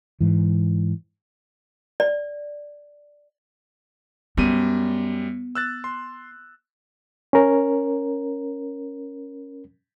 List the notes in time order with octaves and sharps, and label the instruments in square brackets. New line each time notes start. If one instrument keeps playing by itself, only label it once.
[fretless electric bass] G#2 E3
[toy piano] D5
[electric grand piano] F#2 G3 D#7 [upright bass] B3
[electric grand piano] E6 F#6 A6
C6
[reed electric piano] C#4 A#4